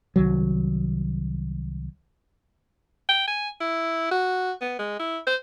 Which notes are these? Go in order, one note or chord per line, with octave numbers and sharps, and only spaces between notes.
C2 D#3 F#3
G5
G#5
E4
F#4
B3
G#3
E4
C5